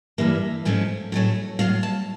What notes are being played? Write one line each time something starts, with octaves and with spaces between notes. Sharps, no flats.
G2 E3 G3 A#3 E5
G#2 F3 A3 C#4
A2 F#3 A3 C#4
A2 F#3 A3 F5
A5